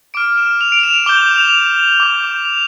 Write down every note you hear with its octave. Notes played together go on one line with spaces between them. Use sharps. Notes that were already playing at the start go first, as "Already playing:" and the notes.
D6 F6 D7
E7
F7
D7
F7
E7
D6 G6 G7
F7
E7
F7
D6 G6
F7